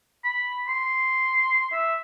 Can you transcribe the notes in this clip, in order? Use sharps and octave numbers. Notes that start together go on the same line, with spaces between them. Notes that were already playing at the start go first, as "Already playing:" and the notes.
B5
C6
E5